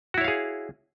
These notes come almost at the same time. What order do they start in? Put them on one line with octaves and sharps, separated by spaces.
F#4 E4 C#5 F5 G#4